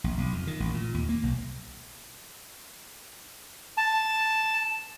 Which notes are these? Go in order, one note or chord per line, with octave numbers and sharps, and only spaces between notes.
A#1
B1
F2
D#3
A1
A#2
D#2
A#3
B1
A5